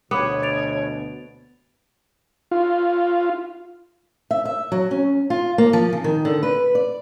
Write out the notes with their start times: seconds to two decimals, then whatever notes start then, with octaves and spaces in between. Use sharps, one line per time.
0.11 D2 B2 B3 C#5 D6 D#6
0.43 A6 D7 F7
2.51 F4
4.31 E5
4.45 E5
4.72 F#3
4.91 C#4
5.30 F4
5.58 A#3
5.73 F3
5.92 C#3
6.04 D#3
6.25 D3
6.43 B4
6.75 D5